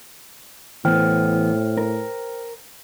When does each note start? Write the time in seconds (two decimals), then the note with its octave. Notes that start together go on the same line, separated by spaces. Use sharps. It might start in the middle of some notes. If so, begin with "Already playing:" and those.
0.85 A2 E3 B3 C5 G5 F6
1.78 A#4